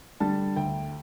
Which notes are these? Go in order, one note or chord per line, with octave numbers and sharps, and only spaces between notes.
D3 G3 A5
D2 G5